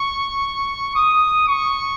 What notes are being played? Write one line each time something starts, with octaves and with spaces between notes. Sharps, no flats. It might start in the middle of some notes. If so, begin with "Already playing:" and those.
Already playing: C#6
D#6
C#6